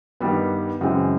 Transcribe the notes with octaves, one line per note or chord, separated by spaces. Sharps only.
G2 D#3 G3 B3
F#2 C#3 E3 G#3 C4